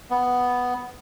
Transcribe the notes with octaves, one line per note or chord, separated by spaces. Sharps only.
B3